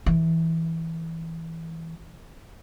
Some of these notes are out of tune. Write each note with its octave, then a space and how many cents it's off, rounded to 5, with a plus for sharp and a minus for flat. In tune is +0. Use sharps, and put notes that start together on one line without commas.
E3 -10